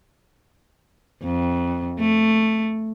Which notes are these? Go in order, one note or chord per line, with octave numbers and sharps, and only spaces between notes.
F2
A3